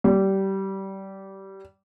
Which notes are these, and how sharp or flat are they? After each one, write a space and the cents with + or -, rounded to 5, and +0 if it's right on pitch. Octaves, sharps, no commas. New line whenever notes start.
G3 -20